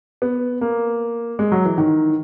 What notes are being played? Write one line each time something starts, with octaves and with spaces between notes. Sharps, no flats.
B3
A#3
G#3
F#3
E3
D#3